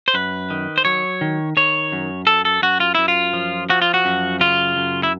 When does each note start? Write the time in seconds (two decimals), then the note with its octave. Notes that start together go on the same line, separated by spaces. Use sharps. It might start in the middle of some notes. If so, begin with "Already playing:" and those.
0.08 C5
0.14 F#2 B4
0.50 D#3
0.78 C5
0.85 F#3 C#5
1.21 D#3
1.57 D#3 C#5
1.92 F#2
2.27 F#2 A4
2.45 A4
2.62 F#2 F#4
2.80 F4
2.95 F#2 E4
3.08 F4
3.33 F3
3.70 F3 F#4
3.82 F4
3.94 F#4
4.05 F#2
4.40 C#3 F4
4.77 F#2
5.03 E4